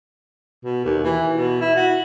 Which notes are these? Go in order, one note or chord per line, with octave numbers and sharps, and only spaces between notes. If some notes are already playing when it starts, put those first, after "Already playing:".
B2
D#2
E3
B2
E4
F#4